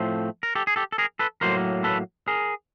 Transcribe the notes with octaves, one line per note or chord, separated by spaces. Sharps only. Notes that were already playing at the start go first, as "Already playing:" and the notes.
Already playing: A2 F3 A3 C4
A#4
G4 A4
G#4
G4 A4
A4
G#4 A#4
A4 B4
A2 F#3 A#3 A#4 C5
A4 B4
G#4 A#4